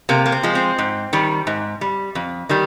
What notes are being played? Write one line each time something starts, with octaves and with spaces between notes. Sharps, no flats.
C3 A#3
A#3
C4
F3 G#3
C4
G#2
D#3 G3
G#2
G3
F2
D#3 G3